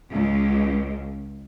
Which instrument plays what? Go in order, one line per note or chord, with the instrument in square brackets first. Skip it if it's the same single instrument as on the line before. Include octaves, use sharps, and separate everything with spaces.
[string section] C#2